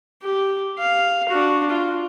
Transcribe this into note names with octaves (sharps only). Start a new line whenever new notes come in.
G4
F5
D4 F#4
F4